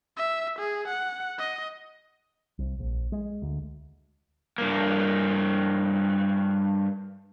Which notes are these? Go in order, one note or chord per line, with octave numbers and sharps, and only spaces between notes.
E5
G#4
F#5
D#5
C2
A#1
G#3
D2
G2 A#3